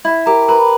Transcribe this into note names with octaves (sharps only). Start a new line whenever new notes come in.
E4
G4 A#4 A#5
A#4 B4 A#5